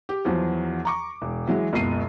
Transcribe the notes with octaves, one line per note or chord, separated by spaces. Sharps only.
G4
E2 F3 F#3
A#5 C#6 D6
E1
E3 F#3 G#3
F#1 C#2 B2 C7 D#7